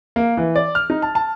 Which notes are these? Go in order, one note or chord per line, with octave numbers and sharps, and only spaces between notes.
A#3
E3
D5
F6
D#4
A5
A5